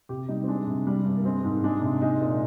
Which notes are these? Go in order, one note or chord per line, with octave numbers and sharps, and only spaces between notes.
C3 G4
G3 D#4
C4
G#3 D4
C3
G3
G2
A#3
G#3 C4
G#2
G#3 D4
C3
G#3 D#4
A#2